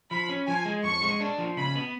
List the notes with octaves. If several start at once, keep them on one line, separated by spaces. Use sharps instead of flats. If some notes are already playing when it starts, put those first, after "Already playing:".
F3 B5
C#4
F3 G#5
G#3
F2 C#6
G#3
D4
F3
C#3 B5
B3